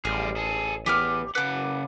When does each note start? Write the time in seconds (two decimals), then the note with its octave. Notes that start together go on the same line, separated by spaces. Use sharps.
0.05 A1 G3 G#4 F6
0.36 G#4 A4
0.86 E3 B3 G4 D6 F6
1.35 C#3 B4 F#5 D6